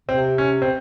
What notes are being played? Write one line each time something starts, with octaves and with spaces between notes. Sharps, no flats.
C3 C4
C#4
C4